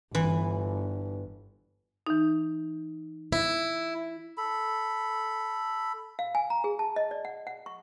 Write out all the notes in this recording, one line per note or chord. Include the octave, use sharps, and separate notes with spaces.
G1 E3
E3 D#4
E4
A4 B5
F5
G#5
A#5
G#4
A5
D#5
D5
F#5
F#5
C#6